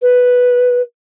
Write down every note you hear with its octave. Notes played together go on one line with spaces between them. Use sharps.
B4